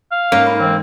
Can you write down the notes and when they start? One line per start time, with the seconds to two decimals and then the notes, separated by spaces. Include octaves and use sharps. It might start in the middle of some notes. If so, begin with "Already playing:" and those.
0.11 F5
0.32 G#2 A3 A#3 C#4 A#4 C#5
0.47 D#4 B5
0.60 E3 G#3 C4